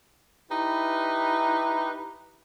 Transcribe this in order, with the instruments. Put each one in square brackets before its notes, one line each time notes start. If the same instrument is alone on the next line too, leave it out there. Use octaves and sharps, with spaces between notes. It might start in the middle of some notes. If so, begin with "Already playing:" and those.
[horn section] D#4 E4 G4 B4